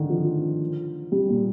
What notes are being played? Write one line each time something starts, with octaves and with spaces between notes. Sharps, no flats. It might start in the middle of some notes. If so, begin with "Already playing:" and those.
Already playing: D3 D#3
F3
G3
A#2